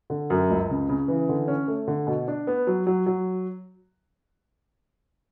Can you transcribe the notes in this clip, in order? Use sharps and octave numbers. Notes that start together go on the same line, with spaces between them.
D3
F#2
C#2
C#3
C#3
E3
D3
C#4
A3
D3
B2
D4
B3
F#3
F#3
F#3